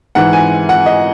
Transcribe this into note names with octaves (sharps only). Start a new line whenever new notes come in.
G#2 E3 F#5
G#5
F#5
D#5